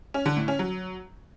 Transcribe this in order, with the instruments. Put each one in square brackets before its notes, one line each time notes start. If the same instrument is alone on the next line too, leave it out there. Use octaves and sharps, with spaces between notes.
[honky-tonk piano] C#4
D3
A2
C#4
F#3